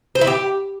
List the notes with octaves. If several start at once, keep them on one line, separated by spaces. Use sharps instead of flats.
C5
E4
G4